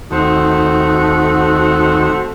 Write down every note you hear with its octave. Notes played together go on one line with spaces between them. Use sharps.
D#2 A3 C4 F#4